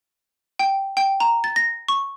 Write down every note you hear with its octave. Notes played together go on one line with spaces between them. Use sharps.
G5
G5
A#5
A6
A#6
C#6